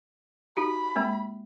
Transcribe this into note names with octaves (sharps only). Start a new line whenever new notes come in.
D#4 F#4 G4 B5
G#3 A#3 C4